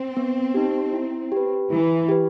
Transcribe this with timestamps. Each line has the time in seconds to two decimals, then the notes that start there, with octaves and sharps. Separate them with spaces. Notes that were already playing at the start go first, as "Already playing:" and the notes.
Already playing: C4
0.17 B3
0.54 D#4 G4
0.93 E4
1.32 G4 B4
1.70 E3 E4
2.08 G4 B4